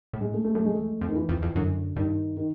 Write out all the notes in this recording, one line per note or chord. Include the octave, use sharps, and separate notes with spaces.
A2
G#3
A3
A3
F#2 A3
G#3
E2 A3
F2
F2
D#3
E3
F2
F2
F#2 D3
G2 D#3
D#3